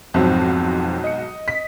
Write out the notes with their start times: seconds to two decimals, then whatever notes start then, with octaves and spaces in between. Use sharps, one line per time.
0.14 B1 F2 G#2 F#3 C4
1.04 D#5 C#7
1.48 B6